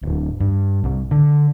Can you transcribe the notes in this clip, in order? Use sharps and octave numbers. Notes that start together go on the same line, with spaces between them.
D1
G2
C2
D3